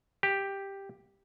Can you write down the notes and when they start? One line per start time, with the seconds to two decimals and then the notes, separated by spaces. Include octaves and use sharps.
0.23 G4